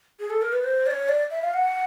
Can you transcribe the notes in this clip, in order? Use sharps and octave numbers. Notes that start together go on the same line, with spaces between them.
G#4
A4
A#4
B4
C5
D5
C#5
D5
E5
F5
F#5